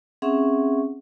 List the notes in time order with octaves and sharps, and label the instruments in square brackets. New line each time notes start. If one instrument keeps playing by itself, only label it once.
[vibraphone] C4 C#4 G#4 E5 F#5 C#6